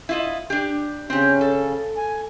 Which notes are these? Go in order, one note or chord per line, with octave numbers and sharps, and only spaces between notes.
E4 F4 D#5
D4 G4
C#3 C4 C#4 G4
A4
G#5